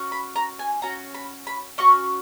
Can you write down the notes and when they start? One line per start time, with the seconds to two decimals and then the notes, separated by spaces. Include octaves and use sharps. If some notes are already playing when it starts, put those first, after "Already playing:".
Already playing: C#4 F#4
0.12 B5
0.36 A#5
0.59 G#5
0.82 C#4 F#4 A#5
1.14 B5
1.47 B5
1.78 C#4 F#4 C#6